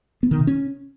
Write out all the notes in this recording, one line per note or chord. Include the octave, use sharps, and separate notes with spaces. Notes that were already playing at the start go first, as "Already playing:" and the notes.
B3
D#3
C3
C#4